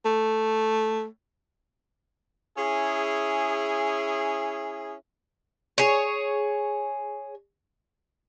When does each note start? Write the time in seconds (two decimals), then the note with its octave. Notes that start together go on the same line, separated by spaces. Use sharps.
0.05 A3
2.57 C#4 E4 G#4
5.78 G#4 C#5